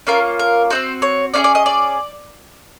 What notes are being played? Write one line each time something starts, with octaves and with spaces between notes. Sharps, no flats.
A#3 C#4 F4 A#4
A#4
C4 D#4 F#4 C5
C#5
C#4 F4 G#4 D5
D5
D#5
D5